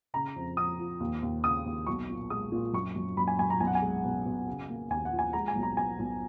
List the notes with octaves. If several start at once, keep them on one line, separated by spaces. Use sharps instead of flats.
C#3 A#5
F2
F2 D#6
F3
D#2
D#2
C#3 D#6
D#2
B1 C#6
A#2
G#3 D#6
A#2
F#2 C#6
F#2
F#2 B5
G#5
F#2 G#5
A#5
B1 G#5
F#5
G#5
G#3
B2
B2
C#3
A#3
D#2 G#5
F#5
F3
G#5
G#3 A#5
G#5
B1
A#5
B2 G#5
B1